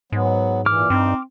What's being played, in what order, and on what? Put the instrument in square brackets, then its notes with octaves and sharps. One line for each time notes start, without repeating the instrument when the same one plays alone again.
[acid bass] G#2 [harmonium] F#3 B3
[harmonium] A#2 E3 [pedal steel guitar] D6 F6
[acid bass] G2 [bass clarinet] C4 [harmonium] D#4